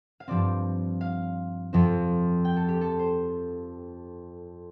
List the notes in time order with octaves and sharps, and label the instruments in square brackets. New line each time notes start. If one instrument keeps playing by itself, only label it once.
[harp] F5
G2 F3 C4 D5
F5
F2 F3 C4
G5
A4
G4
A4
C5